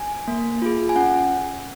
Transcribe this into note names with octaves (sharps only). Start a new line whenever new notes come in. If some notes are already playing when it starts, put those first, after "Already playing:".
Already playing: G#5
A#3
F4 G#4
G#5
C#4 F#5